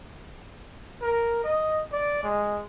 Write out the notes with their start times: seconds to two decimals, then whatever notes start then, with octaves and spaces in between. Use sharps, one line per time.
1.02 A#4
1.44 D#5
1.92 D5
2.23 G#3